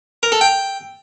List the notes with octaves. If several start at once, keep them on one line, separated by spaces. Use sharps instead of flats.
A#4
A4
G5